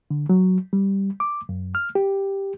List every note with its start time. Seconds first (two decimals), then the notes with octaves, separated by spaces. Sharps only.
0.11 D3
0.29 F#3
0.73 G3
1.20 D6
1.49 F#2
1.75 F6
1.95 G4